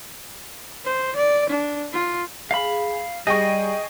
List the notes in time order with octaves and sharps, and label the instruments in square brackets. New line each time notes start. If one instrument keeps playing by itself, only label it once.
[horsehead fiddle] C5
D5
D4
F4
[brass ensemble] G#4 [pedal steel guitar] F5 B5
[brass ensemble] G3 [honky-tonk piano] G#4 G5 C#6 [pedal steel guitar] D#5